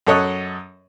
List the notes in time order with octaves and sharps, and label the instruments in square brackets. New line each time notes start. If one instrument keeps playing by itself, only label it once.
[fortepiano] F#2 A4 C#5 D#5 F#6